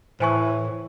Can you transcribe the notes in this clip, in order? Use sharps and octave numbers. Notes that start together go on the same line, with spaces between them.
A2 E3 C5 G#5 C#6